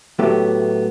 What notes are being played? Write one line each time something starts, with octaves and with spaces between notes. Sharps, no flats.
A2 F#3 A3 B3 G4